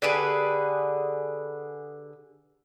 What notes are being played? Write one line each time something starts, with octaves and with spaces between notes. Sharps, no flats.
D3 G4 G#4 B4